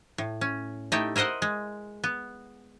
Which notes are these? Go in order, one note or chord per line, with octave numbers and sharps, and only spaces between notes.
A2
C#4
A3 D#4 E4 G4 G5
E4 A#4 C5 D#5 F#5
G#3
B3